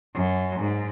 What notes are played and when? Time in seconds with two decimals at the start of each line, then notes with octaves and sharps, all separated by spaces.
0.15 F#2
0.59 G#2